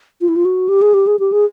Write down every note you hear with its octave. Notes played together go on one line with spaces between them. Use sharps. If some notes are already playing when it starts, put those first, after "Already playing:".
F4
E4
F4
F#4
G4
G#4
G4
G#4
G4
G#4